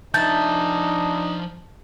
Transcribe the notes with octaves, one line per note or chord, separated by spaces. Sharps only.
F3 D4 D#4 E5 A5 G6